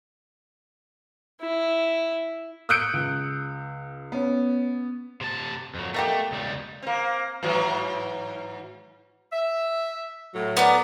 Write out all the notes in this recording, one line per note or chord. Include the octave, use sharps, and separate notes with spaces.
E4
D#6 E6 F#6 G6 C#7 D7
C#2
B3 C#4
C3 A5
F2 F#3
B2 A3 A#3 G4
C#2 G3
A#3 C4
G#2 E3 F#3
E5
A2 F#3
B3 A#4 D5